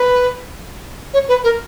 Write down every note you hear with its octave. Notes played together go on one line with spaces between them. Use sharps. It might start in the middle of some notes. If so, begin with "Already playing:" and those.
Already playing: B4
C#5
B4
A#4